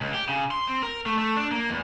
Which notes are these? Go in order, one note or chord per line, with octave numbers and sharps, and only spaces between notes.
C#2
G4
C#3
C6
C4
A#4
A3
A3
D4
A#3
E2